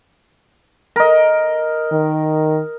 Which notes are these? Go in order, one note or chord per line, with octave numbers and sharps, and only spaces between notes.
A#4 D#5
D#3